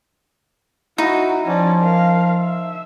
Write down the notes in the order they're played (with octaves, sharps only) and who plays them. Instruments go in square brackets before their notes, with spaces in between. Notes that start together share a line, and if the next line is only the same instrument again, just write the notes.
[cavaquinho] D#4 [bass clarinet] E4 [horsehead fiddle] F#4
[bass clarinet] F3 [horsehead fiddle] C#4 D5
[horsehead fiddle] A#4 F5
E5